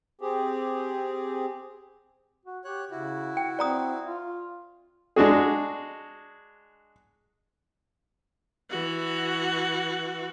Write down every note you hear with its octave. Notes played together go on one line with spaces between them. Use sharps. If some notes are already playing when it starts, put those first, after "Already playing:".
C4 G4 G#4
F#4
G4 C#5 F#6
C#3 E4 F#4
G5
C4 D5 A#5 D#6
F4
G#3 D4 F#4 G#4
E3 F#4